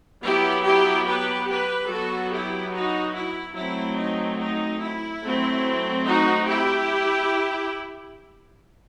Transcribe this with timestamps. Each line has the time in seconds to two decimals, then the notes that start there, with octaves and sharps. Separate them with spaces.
0.23 F#3 B3 E4 G4
0.64 E4 G4
1.07 G4 B4
1.49 G4 B4
1.89 F#3 B3 F#4 A4
2.32 E4 G4
2.73 D#4 F#4
3.15 E4
3.56 F#3 A3 C4 E4
3.98 D#4
4.39 D#4
4.82 E4
5.23 F#3 A3 C4
6.06 D#4 F#4
6.47 E4 G4